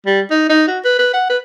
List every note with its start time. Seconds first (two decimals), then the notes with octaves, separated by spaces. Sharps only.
0.06 G3
0.31 D#4
0.50 D#4
0.68 F#4
0.85 B4
0.99 B4
1.14 F#5
1.30 B4